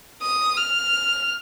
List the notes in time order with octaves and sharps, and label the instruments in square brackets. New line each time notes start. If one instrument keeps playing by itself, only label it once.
[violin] D#6
F6